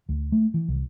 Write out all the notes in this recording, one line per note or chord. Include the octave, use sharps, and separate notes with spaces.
D2
A3
E3
C2